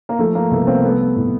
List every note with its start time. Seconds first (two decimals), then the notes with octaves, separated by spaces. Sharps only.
0.09 A#3
0.19 F3 A3
0.35 A#3
0.51 C2 A3 B3
0.67 A#3 C4
0.83 G3 A3 B3
1.16 A2